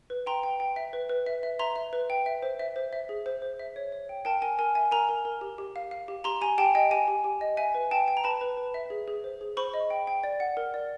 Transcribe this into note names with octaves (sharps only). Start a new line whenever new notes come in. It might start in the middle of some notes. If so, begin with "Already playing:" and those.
B4
G5 A#5 C6
G5
G5
E5
B4
B4
E5
E5
E5 A#5 C6
E5
B4
G5
E5
C5
E5
C5
E5
G#4
C5
C5
E5
C#5
C#5
G5
A#4 G5 A5
A#4 G#5
A#4 G#5
E5 G#5
A#4 G#5 A#5
A#4
A#4
G4
G4
F5
F5
G4
G4 A#5 C6
G4 G#5 A#5
G4 G5 A5
D#5 G5
G4 G#5
G4
G4
D#5
E5 G#5
B4
G5 A5
G5
A#5
B4 A5 B5
B4
B4
E5
G#4
G#4
C5
G#4
C5 B5 C#6
D#5
G5
G5
D5
F#5
A#4
D5